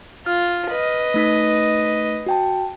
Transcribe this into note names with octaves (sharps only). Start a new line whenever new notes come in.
F4 F6
B4 D#5
A3 D#4 B6
F#4 G5 A5